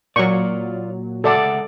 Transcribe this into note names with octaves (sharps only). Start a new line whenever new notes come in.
A#2 F#3 F4 D5 C#6
C#2 A4 D5 E5 F#5 A5